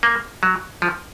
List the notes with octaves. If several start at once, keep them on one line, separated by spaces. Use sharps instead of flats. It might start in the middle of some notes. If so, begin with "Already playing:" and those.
A#3
F#3
F3